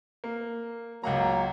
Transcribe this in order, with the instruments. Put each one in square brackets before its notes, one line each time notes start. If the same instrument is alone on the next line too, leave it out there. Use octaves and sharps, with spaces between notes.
[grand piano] A#3
[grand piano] C#2 F#5 A#5 [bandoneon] F#3 A#3